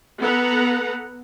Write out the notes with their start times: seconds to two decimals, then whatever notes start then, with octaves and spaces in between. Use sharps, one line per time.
0.20 B3 A4 B4 F#5 A#5